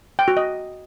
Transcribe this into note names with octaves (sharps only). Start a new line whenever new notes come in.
G5
F#4
D#5